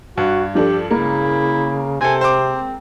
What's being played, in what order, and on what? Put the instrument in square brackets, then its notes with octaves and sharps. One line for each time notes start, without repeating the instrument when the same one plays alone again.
[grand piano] G2 [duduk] F#4
[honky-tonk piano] F3 D4 A4 [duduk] G4
[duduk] C#3 [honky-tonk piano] G#3 A#3 [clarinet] E4
[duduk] C3 [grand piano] C4 A4 [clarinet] G#5
[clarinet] C4 [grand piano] C5 D6